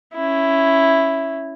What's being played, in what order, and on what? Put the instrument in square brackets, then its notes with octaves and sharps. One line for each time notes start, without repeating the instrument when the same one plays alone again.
[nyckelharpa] C#4 E4